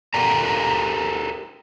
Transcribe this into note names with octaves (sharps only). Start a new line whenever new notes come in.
G4 A4 A#4 D5 A#5